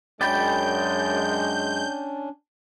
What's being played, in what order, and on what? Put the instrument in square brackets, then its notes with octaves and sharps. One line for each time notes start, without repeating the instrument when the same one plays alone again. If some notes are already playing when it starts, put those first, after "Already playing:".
[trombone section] F#2 G#3 [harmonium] C#4 D4 [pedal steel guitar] D5 G5 B5 [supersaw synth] G6